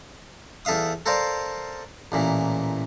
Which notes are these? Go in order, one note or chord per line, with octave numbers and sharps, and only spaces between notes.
E2 A4 E5 F5 D#6
A4 A#4 C5 D5 F5 A5
A1 A#2 E3